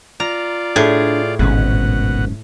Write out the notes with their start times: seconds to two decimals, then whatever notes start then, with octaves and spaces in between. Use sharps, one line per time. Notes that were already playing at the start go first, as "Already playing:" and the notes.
0.20 F4 D5 A#5
0.76 A2 D4 G#4
1.39 D1 G#1 G#2 B2 C#4 F#5